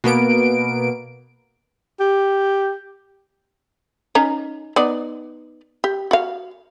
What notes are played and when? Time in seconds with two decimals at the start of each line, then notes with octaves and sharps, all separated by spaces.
0.04 B2 A#3 B3 D7
2.00 G4
4.15 C#4 D#4 A#5
4.76 B3 D#4 D5
5.84 G4
6.11 F#4 F5